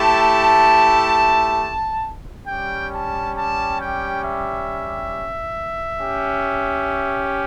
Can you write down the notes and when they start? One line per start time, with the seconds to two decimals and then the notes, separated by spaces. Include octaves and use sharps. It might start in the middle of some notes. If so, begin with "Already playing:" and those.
Already playing: A3 E4 G4 A5
2.47 G3 C#4 G4 G5
2.92 A5
3.35 A5
3.79 G5
4.23 E5
6.00 C#4 G4